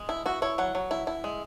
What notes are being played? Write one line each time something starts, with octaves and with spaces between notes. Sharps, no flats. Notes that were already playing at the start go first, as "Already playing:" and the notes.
Already playing: G#3
E4
E4 F#4
E4 C#5
F#3 F#5
F#3
E4
E4
G#3